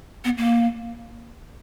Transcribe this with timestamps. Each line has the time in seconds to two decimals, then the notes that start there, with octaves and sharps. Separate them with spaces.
0.25 B3
0.38 A#3